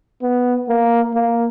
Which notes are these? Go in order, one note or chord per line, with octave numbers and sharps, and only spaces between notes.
B3
A#3
A#3